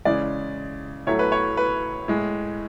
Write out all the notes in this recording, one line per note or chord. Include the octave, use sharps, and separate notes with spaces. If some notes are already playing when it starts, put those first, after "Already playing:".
C#3 E3 G#3 D5
A2 F#3 A3 C#5
B4
C#5
B4
A2 G#3